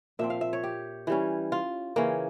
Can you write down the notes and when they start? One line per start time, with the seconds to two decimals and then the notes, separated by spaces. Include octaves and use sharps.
0.19 A#2 F3 C4 E5
0.30 F5
0.41 E5
0.53 C#5
0.63 G4
1.07 E3 G3 C#4
1.52 F4
1.96 C#3 E3 A#3 C#4